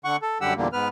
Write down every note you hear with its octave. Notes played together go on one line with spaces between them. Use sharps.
D3 F#5 C#6
A4
F#2 D3 G3 G4 F#5 E6
E2 A#2 D3 G3 A#3
G#2 B3 B4 F6